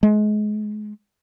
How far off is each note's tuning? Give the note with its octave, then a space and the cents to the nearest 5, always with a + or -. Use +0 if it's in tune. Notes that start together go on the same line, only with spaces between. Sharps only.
G#3 +30